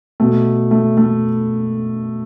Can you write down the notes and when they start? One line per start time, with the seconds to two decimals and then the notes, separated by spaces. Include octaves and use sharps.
0.20 B2 A3
0.71 A3
0.97 A3